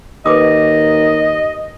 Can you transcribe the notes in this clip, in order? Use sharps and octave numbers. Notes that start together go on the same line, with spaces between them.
D#2 B4 D#5 D6 D#6